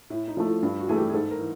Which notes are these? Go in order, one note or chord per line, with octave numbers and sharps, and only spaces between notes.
A2 E4
D#4
F3 A3
E4
G2 F4
F#4
E3 A3 G#4
G4
G#4
G#2 A4
A#4
E3